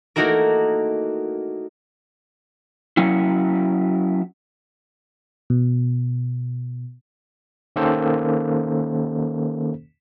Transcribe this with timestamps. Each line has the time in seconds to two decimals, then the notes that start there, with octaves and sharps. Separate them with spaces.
0.16 A3 A#3 D#4 E4 F#4 A#4
2.97 F#3 C#4 E4
5.50 B2
7.76 D#3 A#3 C#4 A4 C5